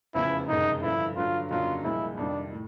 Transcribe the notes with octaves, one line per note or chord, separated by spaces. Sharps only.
F1 E2 C#3 F3 E4
F#1 F2 C3 D#3 G#3 D#4
G2 D3 F3 E4
G2 D3 F#3 F4
F2 C#3 F#3 A#3 D4 F4
C2 A#2 F3 G#3 E4
F2 C3 D#3 G3 D4
A2